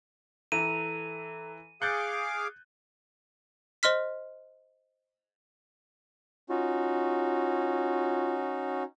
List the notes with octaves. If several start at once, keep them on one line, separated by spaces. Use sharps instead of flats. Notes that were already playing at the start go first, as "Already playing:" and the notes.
E3 A4 A#5 D#7
G#4 F5 D6 F#6 G6 A6 C#7
C5 D#5 C6 F6 B6
C#4 D#4 F4 F#4